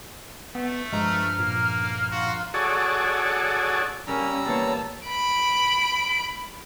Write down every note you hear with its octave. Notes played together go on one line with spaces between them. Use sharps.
A3 B3
G2 F3 G#3 A#5 F6
A#2 A#3
F4 F#4
F#4 G#4 A4 C#5 D5
C#3 G3 A#3 C#4 A#5 E6
A#2 C#3 E3 A#3 B3 C#5 A5
B5 D7